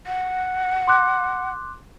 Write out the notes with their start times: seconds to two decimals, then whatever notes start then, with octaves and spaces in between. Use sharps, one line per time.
0.07 F#5
0.88 C6 D6 F#6